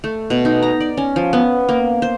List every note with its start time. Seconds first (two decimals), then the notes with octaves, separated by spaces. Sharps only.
0.04 A3
0.30 B2
0.45 D#4
0.63 A#5
0.80 D5
0.97 C#4
1.16 F3
1.33 B3
1.69 A#3
2.02 C5